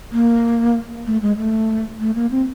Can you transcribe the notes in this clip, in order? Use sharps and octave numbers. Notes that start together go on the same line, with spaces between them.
A#3
A3
G#3
A3
A3
A#3
C4